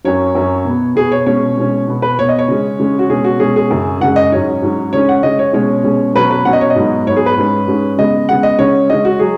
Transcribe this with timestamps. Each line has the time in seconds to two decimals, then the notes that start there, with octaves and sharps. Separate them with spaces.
0.04 F#2 F#3 C#4 C#5
0.35 F#2 F#3 C#4
0.65 B2 B3
0.96 B2 B3 G#4
1.12 C#5
1.26 B2 G#3 C#4 C#5
1.57 B2 G#3 C#4
1.88 B2 B3
2.02 B4
2.19 B2 B3 C#5
2.29 D#5
2.39 C#5
2.48 C#3 G#3 C#4
2.80 C#3 G#3 C#4
2.99 F#4
3.10 B2 G#3 C#4 G#4
3.24 F#4
3.40 B2 G#3 C#4 G#4
3.56 G#4
3.71 F#2 C#3 G#3
4.01 F#2 C#3 G#3 F#5
4.16 D#5
4.32 G#2 F#3 C#4 C#5
4.62 G#2 F#3 C#4
4.93 C#3 G#3 C#4 C#5
5.09 F#5
5.23 C#3 G#3 C#4 D#5
5.39 C#5
5.53 B2 G#3 C#4 C#5
5.84 B2 G#3 C#4
6.14 B2 F#3 C#4 B4
6.30 B4
6.45 B2 F#3 C#4 F#5
6.53 D#5
6.61 C#5
6.70 D#5
6.76 G#2 F#3 B3
7.07 G#2 F#3 B3 C#5
7.16 G#4
7.26 B4
7.38 G#2 G#3 C#4
7.68 G#2 G#3 C#4
7.98 C#3 G#3 B3 D#5
8.29 C#3 G#3 B3 F#5
8.43 D#5
8.59 C#3 G#3 C#4 C#5
8.90 C#3 G#3 C#4 D#5
9.05 F#4
9.20 F#3 G#4